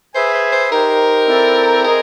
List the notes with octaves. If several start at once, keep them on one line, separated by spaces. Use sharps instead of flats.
G#4 B4 C5 E5 G#5
C5
C5
D#4 G4 A#4 C5
C4 E4 A4 D5 G5
G#4 A#4 C5 D#5